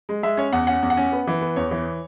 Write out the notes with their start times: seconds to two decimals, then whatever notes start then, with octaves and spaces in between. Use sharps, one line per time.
0.09 G#3
0.23 G#3 E5
0.37 C#4 C#5
0.53 E2 F#5
0.67 C#4 F#5
0.83 E2
0.90 F#5
0.97 C#4
1.12 B3
1.27 E3
1.41 B3
1.56 E2 C#5
1.71 E3